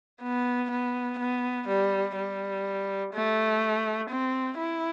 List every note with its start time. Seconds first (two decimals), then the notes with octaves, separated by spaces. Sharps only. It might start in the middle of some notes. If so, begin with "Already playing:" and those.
0.22 B3
0.71 B3
1.19 B3
1.68 G3
2.16 G3
3.13 A3
4.09 C4
4.58 E4